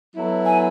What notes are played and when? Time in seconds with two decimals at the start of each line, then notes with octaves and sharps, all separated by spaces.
0.15 F#3 B3 E4 A4
0.46 G#5